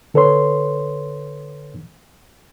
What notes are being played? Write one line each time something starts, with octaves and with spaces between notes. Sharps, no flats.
D3 A4 B4 C#5 C6